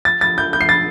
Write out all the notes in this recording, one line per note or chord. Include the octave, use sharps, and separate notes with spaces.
A6
A6
G6
G6
C7
A6